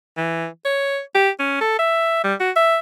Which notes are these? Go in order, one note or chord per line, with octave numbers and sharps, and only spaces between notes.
E3
C#5
G4
C#4
A4
E5
G3
F#4
E5